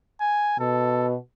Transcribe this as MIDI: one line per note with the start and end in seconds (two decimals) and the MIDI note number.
0.21 0.56 80
0.59 1.16 47
0.59 1.07 69